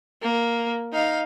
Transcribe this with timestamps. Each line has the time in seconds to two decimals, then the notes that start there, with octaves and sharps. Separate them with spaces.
0.22 A#3
0.93 D#4 F5